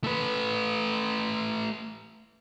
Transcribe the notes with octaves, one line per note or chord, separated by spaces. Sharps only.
A3 B4